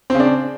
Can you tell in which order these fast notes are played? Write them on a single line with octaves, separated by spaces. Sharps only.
C4 C#3 D4